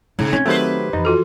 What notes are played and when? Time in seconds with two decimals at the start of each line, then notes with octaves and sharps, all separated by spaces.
0.19 G#2 C#3
0.33 C4 C#4
0.46 D#3 F#3 A3 G4 B4 C5
0.93 F2 E3 F3 D#4
1.05 F4 F#4 A4